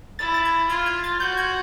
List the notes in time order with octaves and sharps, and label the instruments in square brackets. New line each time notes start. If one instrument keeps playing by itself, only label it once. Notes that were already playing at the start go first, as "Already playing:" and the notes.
[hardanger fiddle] E4 [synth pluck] A6
[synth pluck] A6
G#6
[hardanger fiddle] F4 [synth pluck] G#6
[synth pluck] G#6
A6
[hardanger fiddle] F#4 [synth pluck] G6
[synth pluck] G#6